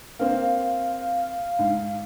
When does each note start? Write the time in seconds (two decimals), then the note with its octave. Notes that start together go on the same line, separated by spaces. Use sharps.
0.19 A#3 C4 F5
1.59 G#2